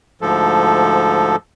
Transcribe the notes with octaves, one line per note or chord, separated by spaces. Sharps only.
D2 G#2 F3 A4